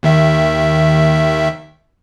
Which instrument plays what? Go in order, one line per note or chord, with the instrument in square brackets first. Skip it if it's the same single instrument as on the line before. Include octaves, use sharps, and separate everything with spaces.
[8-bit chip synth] D#2 D#3 E5